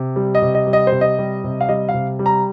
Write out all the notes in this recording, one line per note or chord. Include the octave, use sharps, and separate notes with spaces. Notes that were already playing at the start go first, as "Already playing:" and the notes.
Already playing: C3
G3
D#5
C3
D#5
G3
D#5
C3 C5
D#5
G3
C3
F5
G3 D#5
F5
C3
G3
A#5